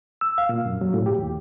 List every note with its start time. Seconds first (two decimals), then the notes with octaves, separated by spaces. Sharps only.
0.21 E6
0.38 F5
0.49 A#2
0.66 F#2
0.81 F#3
0.94 A2
1.06 G4
1.18 D#2